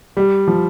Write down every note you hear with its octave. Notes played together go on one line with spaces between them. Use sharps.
G3
F3